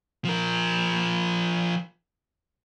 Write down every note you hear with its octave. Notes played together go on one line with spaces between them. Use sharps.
F3 A#4